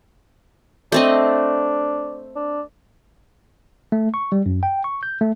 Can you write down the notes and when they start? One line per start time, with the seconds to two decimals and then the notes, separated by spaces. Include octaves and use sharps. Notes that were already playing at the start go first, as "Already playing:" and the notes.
0.92 A3 C4 D4 D#5
2.36 D4
3.92 A3
4.14 C#6
4.32 G3
4.46 F#2
4.63 G5
4.84 C#6
5.03 G6
5.21 A3